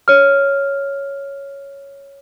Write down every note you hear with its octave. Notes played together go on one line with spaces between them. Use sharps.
C#5 F6